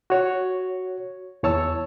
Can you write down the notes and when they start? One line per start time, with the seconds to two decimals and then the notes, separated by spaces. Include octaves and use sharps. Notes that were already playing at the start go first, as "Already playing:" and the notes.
0.10 F#4 C#5
1.43 E2 E3 C#5 A5 E6